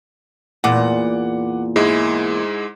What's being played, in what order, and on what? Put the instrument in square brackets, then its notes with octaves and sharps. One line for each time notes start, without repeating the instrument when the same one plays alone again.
[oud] E2 A#2 [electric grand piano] F#5 D6
[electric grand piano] G#2 G#3 E4